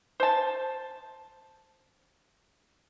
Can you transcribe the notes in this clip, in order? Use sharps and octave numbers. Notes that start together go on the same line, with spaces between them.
C5 A5